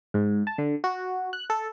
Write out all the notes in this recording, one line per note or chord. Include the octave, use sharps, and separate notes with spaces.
G#2
A5
D3
F#4
F#6
A4